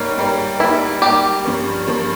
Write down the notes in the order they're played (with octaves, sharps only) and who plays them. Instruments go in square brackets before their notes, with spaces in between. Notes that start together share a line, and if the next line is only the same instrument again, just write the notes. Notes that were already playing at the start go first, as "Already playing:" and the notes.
Already playing: [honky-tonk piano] G#2 G3 A#3 [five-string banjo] C#4
[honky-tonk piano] G#2 G3 A#3
[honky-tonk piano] G#2 G3 A#3 [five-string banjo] E4
[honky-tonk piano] G#2 G3 A#3 [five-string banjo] G4
[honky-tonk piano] G2 F3 A#3 C#4
G2 F3 A#3 C#4